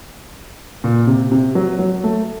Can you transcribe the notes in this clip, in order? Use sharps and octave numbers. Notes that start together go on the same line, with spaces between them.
A#2
C3
C3
F#3
F#3
A3